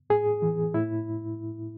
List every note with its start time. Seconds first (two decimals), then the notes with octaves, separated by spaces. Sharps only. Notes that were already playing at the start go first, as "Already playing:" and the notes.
0.10 A2 G#4
0.42 E3
0.74 A2 E4